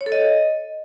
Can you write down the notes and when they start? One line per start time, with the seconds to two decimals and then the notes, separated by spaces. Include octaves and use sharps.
0.01 C#5
0.06 A4
0.12 D#5